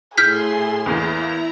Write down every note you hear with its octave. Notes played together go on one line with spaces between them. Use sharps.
A2 A3 G#4 C6 F6 G6 B6
E2 A#3 E4 A#5